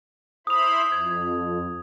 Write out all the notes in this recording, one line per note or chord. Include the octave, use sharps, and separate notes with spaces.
E4 C5 B5 D#6 F7
F2 G#6